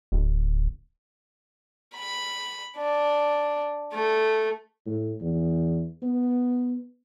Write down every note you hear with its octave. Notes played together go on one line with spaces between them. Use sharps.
D1
B5
D4
A3
A2
E2
B3